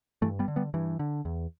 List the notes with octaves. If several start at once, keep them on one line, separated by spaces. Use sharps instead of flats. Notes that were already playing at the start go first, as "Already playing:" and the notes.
G2 E3 A3
G3 B3
D3
G3 B3
G2 E3
D3
E2